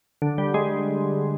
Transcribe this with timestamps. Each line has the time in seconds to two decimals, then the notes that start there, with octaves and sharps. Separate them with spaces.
0.22 D3
0.38 G3
0.54 G#3